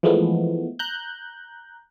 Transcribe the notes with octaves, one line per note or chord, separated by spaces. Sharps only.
E3 F3 G#3 A3 B3
A#5 F#6 G6